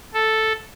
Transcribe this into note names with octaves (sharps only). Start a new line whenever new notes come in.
A4